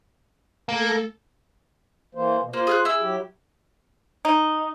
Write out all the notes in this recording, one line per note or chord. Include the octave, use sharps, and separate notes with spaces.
A3 A#3 A4
E3 A#3 C5
B2
A#3 F4 C5
G#4 F6 F#6
E4 G#4 E6
F#3 G4
D#4